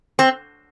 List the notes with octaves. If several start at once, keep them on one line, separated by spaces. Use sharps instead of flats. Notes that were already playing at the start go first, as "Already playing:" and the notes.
C4